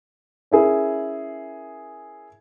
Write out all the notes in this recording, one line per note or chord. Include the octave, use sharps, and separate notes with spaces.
C#4 E4 G#4 A#4